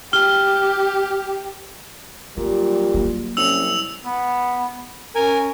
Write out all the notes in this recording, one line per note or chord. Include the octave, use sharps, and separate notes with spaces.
G4 F6 G7
A#2 F#3 G3
F#3 A#3
C2 C#4 E6 F7
B3
C#4 A#4 G#5